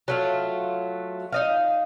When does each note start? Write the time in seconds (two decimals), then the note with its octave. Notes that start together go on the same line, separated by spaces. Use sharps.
0.08 F#3 A3 F4
1.32 D#4 D#5 F5